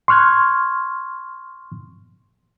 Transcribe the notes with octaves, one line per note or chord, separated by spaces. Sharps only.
C6 C#6 F6 F#6 G#6